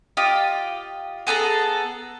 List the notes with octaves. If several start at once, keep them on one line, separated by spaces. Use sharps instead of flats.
F4 G4 D#5
B3 G#4 A4 A#5